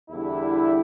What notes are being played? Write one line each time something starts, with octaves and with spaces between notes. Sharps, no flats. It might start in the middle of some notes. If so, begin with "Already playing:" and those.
E2 D3 G3 E4